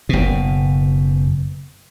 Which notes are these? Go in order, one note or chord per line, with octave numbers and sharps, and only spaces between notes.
F#1 B2